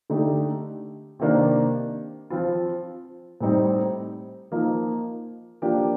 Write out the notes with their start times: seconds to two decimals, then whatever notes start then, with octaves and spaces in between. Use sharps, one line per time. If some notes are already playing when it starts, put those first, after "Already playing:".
0.10 D3 A3 D#4 G4
1.19 C3 D#3 A#3 D4
2.30 F3 C4 F4
3.40 A2 G3 C4 D#4
4.52 F3 A#3 D#4
5.62 F3 A#3 D4 G4